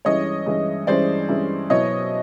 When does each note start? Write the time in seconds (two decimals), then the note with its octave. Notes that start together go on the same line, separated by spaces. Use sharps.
0.05 G2 E3 G#3 C#4 E4 C#5 D#5
0.46 G2 E3 G#3 C#4 E4
0.87 G2 E3 G#3 C#4 E4 C5 D5
1.29 G2 E3 G#3 C#4 E4
1.70 B2 F#3 B3 E4 C#5 D#5